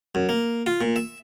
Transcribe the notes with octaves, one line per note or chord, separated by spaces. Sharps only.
F#2
A#3
F4
A#2
E5